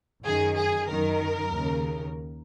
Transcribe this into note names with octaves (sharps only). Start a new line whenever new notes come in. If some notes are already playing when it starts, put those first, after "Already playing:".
F#2 D#3 G#4
G#4
F#2 D#3 A#4
D#2 C#3